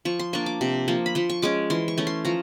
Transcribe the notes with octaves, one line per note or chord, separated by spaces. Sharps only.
F3 C#6
C6
A#3 D4 C#6
D6
C3
F3 A#3
B5
F3 C6
C#6
G#3 C#4 D6
E3 C6
C#6
A3 C#4
C6
F3 A#5